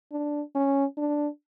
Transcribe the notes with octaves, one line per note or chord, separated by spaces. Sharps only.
D4
C#4
D4